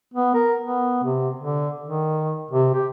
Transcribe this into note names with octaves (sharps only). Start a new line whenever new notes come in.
B3
A#4
B3
C3
D3
D#3
C3
G4